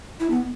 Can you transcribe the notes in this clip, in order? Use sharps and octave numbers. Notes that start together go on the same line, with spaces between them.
E4
B3